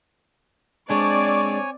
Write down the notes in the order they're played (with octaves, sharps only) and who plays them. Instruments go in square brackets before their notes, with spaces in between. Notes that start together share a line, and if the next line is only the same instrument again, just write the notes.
[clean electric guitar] G#3 D4 [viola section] C4 D5 [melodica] C#5 G#5 [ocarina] C#6